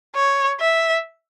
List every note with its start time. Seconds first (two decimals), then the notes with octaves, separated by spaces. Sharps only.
0.15 C#5
0.60 E5